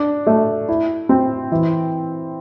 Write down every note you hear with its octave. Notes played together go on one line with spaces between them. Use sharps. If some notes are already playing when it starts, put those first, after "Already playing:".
Already playing: D4
A3
E4
C4
E3